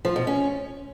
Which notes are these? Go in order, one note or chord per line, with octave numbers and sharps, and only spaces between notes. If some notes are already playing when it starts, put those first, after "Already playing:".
F3
B2
C#4